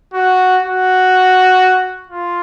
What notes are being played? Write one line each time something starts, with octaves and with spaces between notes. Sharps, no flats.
F#4
F#4
F4